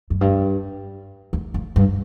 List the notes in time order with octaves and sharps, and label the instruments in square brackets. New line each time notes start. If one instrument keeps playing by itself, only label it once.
[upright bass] F#2
G2
E2
F2
G2